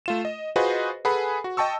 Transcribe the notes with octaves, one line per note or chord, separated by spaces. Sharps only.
A3 F4 E7
D#5
F4 F#4 G#4 B4 C5 D#5
G#4 A4 B4 F#5 G#5 B5
F#4
D#5 G5 A5 C#6 E6